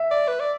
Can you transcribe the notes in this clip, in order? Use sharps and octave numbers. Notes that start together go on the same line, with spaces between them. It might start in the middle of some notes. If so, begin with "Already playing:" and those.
Already playing: E5
D5
B4
D5